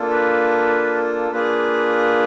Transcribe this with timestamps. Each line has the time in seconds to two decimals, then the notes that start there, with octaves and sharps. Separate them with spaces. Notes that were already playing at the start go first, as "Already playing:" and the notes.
Already playing: A#3 D4 F4 A4
0.10 B4
1.31 A#3 D4 F4 G#4 B4